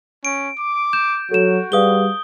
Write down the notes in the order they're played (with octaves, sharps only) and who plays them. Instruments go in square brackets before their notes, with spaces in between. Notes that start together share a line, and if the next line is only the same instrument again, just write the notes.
[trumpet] C#4 [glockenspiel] D7
[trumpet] D6
[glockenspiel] G6 [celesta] E7
[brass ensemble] F#3 [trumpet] F#4 [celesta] A4 E7
[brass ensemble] G3 [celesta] G#4 B4 F5 [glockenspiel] D#6 G7